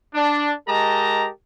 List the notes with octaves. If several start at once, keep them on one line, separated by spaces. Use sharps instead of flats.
D4
G#3 G4 A#4 D#5 A5 A#5